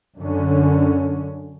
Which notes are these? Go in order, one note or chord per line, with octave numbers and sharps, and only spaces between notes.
F#2 D3 C#4